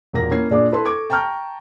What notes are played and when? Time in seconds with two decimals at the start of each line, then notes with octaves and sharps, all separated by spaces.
0.13 E1 A#2 A#3 A#6
0.31 A#3 C#4 E4 G#6 C7
0.51 A#2 D4 G#4 D5 D6
0.72 E4 A4 B4 A5 C6
0.85 A4 C#6 D6 G#6 D7
1.10 G5 A5 A#5 C#6 F6 G6